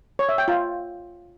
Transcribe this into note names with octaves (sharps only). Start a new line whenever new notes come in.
C#5
E5
G5
F4